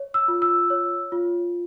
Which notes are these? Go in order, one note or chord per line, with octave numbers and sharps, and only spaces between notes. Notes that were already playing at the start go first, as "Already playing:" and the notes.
Already playing: C#5
E6
F4
E6
C#5
F4